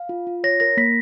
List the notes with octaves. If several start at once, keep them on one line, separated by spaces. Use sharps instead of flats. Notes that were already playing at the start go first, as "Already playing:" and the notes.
Already playing: F5
F4
F4
C#5 A#6
A#4 A#6
A#3 B6